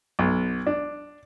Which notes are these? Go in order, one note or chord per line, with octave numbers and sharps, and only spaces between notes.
B1
D4